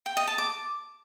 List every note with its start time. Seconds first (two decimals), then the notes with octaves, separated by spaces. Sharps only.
0.06 G5
0.17 D#5
0.27 A5
0.38 D6